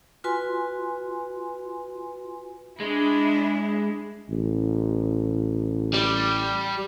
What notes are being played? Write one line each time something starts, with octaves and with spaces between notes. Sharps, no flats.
F4 F#4 B4 G#5 C6
G#3 D4 E4
A1
G3